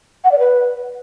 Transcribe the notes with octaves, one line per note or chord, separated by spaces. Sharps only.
F#5
D5
B4